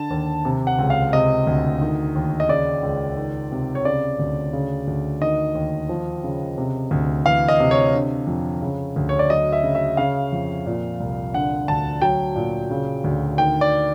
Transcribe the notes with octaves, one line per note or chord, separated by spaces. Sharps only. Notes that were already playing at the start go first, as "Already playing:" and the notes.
Already playing: D3 A5
D#2
C3
F#5
C#2
F5
C3 D#5
D2
D#3
D#2
D#5
C#3 D5
C#2
D#3
C3
C#5
C#3 D5
D2
C#3
D2
D#3 D#5
D#2
F3
C#3
C3
D2
E3 F5
D#5
C3
C#5
D3
F2
C#3
D2
C#5
D5
F#3 D#5
E5
C#3
E5
C#3 F5
F2
A#2
C2
D3 F#5
D2 A5
F#3 G5
A#2
C#3
D2
D#3 G5
D5